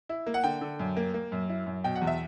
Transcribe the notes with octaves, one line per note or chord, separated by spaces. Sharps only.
E4
A#3
F#5
D3 G5
D3
F#2
A#3
A#3
F#2
E4
F#2
B2 G5
F#5
E2
E5